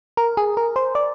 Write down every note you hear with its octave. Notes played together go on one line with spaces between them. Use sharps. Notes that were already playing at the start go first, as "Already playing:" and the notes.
A#4
G#4
A#4
C5
D5